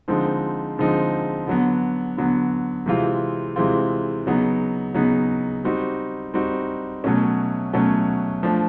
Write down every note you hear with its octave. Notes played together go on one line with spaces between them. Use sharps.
D3 F3 G#3 C4 D#4
D3 F3 G#3 C4 D#4
D3 F#3 B3
D3 F#3 B3
C3 E3 G#3 C4 F4
C3 E3 G#3 C4 F4
C#3 F#3 B3 D#4
C#3 F#3 B3 D#4
G3 C4 D#4 F#4
G3 C4 D#4 F#4
B2 F#3 A3 C#4
B2 F#3 A3 C#4
F3 A3 D4